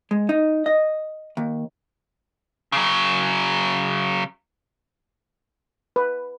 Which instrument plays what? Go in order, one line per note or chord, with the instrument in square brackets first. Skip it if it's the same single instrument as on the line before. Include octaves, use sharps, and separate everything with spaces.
[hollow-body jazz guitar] G#3
D#4
D#5
D#2
[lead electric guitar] C#3 F#3
[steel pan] B4